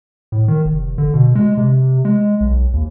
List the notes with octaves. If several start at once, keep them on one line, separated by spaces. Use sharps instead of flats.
A2
D#3
F1
D3
B2
G#3
C3
G#3
B1
D#2